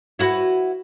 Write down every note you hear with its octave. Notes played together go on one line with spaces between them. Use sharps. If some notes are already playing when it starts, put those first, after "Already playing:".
E4 F#4 B4